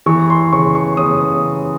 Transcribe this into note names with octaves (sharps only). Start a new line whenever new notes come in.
E3 C#6
C6
C#3 C#6
C#6
C#3 D#6